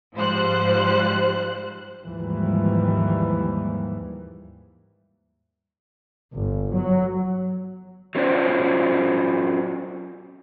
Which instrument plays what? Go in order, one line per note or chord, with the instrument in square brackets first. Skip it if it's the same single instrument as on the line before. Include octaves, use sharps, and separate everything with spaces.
[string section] G#2 F3 G3 C5 F#6
[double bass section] D#2 G#2 E3 F3 G3
G1
F#3
[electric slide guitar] F#3 A3 C#4 F4 C5 D5